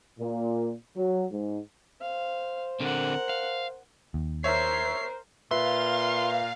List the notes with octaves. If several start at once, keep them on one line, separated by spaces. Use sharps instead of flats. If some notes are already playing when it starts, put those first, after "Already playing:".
A#2
F#3
G#2
C5 F5
D3 C4 A#4 F#5
F5
D#2
A#4 C5 C#5 E5 C7
A#2 F4 B4 E5 F5 C6